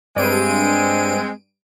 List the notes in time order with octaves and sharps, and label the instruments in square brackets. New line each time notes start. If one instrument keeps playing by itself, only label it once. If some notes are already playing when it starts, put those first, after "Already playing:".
[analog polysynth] G2 D7 D#7 [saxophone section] G#3 C4